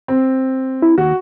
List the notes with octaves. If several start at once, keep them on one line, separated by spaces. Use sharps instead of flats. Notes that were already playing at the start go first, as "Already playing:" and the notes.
C4
E4
D#2 F#4